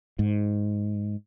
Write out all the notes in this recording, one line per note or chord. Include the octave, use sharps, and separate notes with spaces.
G#2